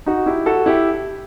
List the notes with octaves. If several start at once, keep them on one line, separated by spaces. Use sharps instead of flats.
D#4 F#4
E4 G4
F#4 A4
E4 G4